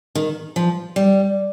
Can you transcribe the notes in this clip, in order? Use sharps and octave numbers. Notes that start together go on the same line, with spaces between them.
D#3
F3
G3